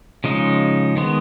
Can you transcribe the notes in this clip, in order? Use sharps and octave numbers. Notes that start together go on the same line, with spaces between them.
C#3 F3 G#3 D#4
D#3 G#3 B3